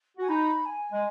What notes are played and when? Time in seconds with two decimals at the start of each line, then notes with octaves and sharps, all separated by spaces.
0.17 F#4 G#5
0.28 D#4 B5
0.66 G#5
0.92 G#3